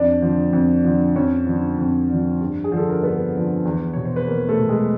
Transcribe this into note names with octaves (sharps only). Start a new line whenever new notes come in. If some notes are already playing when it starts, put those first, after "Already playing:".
Already playing: F2 D4 D5
D3 F3
F2
D3 F3
F2 C#4 C#5
D3 F3
F2
D3 F3
G2
G#4
D3 F3
A4
A#4
G2 B3 B4
D3 F3
E2
B2 C#5
C5
B4
E2 A#3 A#4
A3 A4
B2
G#3 G#4